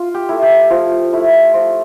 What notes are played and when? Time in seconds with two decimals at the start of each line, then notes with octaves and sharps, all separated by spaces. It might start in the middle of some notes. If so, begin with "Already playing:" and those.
Already playing: F4
0.14 G4
0.29 A3 E4
0.42 G4
0.70 F3 F4
1.13 A3 E4
1.54 F3 F4